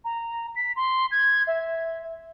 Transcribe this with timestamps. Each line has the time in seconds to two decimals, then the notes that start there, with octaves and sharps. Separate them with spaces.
0.05 A#5
0.56 B6
0.76 C6
1.11 G#6
1.47 E5